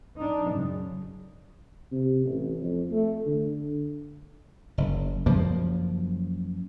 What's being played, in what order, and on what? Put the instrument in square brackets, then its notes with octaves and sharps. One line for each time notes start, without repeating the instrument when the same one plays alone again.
[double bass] D4 D#4
F#2 C#3
[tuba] C3
A1
F2
A3
D3
[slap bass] F#1
F#2 C#3 F3 A#3